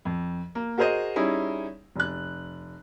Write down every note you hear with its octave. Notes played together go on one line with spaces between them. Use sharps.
F2
A#3
F#4 G#4 A#4 C5 D#5
G3 C#4 D#4 E4 G#4
F1 F#6